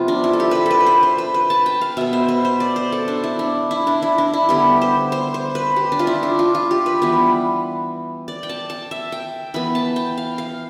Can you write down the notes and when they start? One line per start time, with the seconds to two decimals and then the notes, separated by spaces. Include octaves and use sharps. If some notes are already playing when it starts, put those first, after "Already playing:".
Already playing: C3 F3 B3 F4
0.08 D4
0.24 E4
0.33 A4
0.40 G4
0.51 A4 B4
0.66 A4 B4
0.81 B4
0.87 C5
1.03 C5
1.18 B4
1.34 B4
1.50 A5
1.66 G5
1.81 F5
1.97 B2 B3 E5
2.13 C5
2.29 B4
2.45 C5
2.60 D5
2.76 C5
2.92 A4
3.08 D4
3.24 E4
3.39 D4
3.71 E4
3.87 D4
4.02 E4
4.18 D4
4.34 E4
4.49 D3 G3 B3 G4
4.82 C5
5.12 C5
5.34 C5
5.55 B4
5.76 G4
5.92 D4
5.99 F4
6.07 E4
6.23 D4
6.39 F4
6.55 F4
6.71 G4
6.86 B4
7.02 E3 G3 B3
8.28 D5
8.43 G5
8.49 A5
8.70 A5
8.91 E5
9.12 G5
9.54 E3 B3 B5
9.75 A5
9.96 G5
10.18 F5
10.38 F5